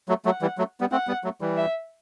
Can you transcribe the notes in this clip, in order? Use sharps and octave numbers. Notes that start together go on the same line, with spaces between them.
F#3 A3
F#3 A3 F#5
E3 G3
F#3 A3
G3 B3
A3 C4 F#5
G3 B3
F#3 A3
E3 G3
E5